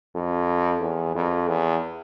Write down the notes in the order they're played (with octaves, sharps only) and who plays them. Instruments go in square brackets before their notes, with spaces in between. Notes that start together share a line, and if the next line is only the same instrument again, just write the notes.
[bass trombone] F2
E2
F2
E2